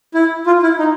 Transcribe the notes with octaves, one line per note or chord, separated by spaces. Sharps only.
E4
F4
E4
D#4